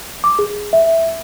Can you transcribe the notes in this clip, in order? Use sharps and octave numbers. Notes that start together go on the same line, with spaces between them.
D6
G#4
E5